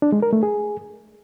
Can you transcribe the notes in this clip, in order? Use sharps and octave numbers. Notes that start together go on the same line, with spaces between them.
D4
G#3
A#4
A3
G#4